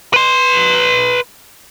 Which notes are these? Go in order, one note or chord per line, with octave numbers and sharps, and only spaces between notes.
B4 C6